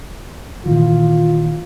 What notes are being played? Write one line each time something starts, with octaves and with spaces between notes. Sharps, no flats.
A#2 D#3 E3 F4